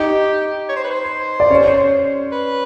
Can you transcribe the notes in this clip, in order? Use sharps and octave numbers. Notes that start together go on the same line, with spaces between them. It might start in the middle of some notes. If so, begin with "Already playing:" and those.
Already playing: D#4 G4 D#5
C#5
C5
B4
C5
D5
C#4 C#5
B4